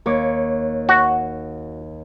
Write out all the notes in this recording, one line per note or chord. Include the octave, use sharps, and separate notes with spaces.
D#2 C#5 D6
F#4